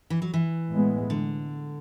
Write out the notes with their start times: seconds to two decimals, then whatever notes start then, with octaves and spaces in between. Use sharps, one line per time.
0.10 E3
0.22 F#3
0.34 E3
0.70 A2 G#3 B3
1.10 D3